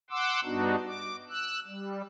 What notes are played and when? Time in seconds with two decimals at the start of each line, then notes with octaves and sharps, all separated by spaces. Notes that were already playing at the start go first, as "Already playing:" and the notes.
0.10 F#5 C6 D6 E6
0.44 G2 B3 D4 D#4 F#4
0.87 D6
1.29 E6 F#6
1.67 G3